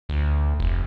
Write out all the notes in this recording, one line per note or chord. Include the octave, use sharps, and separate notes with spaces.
D2
F1